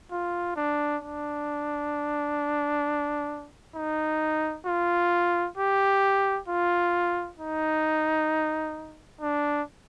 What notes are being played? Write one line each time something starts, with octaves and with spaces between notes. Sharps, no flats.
F4
D4
D4
D#4
F4
G4
F4
D#4
D4